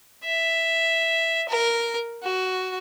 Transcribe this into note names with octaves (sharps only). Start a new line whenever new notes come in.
E5
A#4
F#4